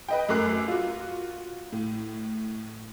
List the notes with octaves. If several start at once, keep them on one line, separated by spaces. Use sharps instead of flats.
B4 D#5 G5
F#2 A3 A#4 D6 F#6 C7
F4 F#4
A2